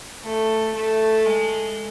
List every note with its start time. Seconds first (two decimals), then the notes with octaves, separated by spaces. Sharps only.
0.24 A3
0.75 A3
1.26 G#3